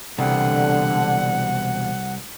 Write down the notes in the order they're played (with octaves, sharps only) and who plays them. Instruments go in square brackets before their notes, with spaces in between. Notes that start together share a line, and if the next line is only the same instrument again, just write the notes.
[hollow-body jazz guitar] C2 [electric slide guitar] B2 E3 G5 [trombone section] D3 [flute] F#5